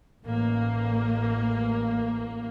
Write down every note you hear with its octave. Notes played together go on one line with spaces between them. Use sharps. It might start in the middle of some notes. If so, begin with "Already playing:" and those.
A1 A#3